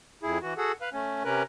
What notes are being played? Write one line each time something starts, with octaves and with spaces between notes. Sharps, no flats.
F2 E4 G#4
E3 F#4
F#4 G#4 A4 F#5
B4 F5
A3 C#4
C3 C#4 A#4 B4